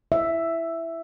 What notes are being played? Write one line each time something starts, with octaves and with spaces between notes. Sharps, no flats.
E5